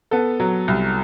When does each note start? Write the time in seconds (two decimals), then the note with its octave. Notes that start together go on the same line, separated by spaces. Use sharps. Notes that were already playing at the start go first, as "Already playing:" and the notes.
0.11 B3 A4
0.40 F#3
0.68 C2